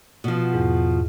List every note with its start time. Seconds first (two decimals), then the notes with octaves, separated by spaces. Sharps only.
0.24 B2 F3
0.53 E2 G#2